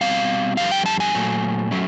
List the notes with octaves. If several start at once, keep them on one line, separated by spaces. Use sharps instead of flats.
B2 G3 C4 F5
F2 D3 G3 F5
G5
A5
G#5
A#2 F#3 A3
F#3 A3 C#4